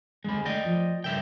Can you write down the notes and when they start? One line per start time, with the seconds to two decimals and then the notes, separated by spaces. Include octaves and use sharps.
0.24 D#2 D3 G#3 C4 B5
0.45 A3 D5 D#5 G5
0.65 F3
1.04 G2 C#3 A#4 C#5 E5 G5